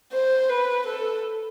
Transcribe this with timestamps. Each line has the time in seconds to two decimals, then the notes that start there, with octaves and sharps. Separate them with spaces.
0.12 C5
0.49 B4
0.86 A4